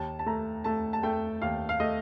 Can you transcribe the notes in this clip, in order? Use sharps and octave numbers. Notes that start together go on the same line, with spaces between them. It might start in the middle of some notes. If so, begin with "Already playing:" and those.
Already playing: D#2 A5
A5
A3 A#5
A3 A5
A5
A3 G5
D#2 F5
F5
A3 D#5